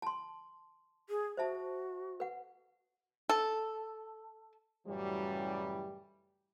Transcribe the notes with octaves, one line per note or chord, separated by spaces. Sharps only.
A5 C6
G#4
F#4 C5 E5 A5
B4 F#5
A4
F#2 A2 C#3 E3 F#3 G3